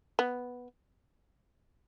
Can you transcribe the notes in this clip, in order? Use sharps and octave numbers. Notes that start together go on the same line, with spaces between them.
B3